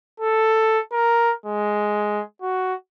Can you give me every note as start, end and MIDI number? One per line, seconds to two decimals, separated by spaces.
0.20 0.79 69
0.92 1.33 70
1.46 2.22 56
2.42 2.74 66